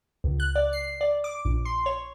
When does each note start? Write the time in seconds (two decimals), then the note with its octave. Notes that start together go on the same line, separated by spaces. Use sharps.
0.24 C#2
0.40 F#6
0.56 D5
0.73 C7
1.01 D5
1.24 D6
1.45 A#1
1.65 C6
1.86 C#5